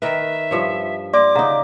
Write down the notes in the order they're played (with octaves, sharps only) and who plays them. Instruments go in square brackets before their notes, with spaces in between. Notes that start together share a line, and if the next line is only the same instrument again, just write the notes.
[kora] D#3 A#4 B4 [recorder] E5
[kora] G2 F3 C#5
[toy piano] D5 E5 C6 [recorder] D6
[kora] C#3 D#4 [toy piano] F5 F#5 A#5